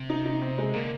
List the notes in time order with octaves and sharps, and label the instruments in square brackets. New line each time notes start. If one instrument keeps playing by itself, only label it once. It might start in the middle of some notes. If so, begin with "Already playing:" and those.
Already playing: [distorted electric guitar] C3
[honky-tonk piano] D#4
D#4
C4
G#3
[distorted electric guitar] D3 [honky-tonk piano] A#3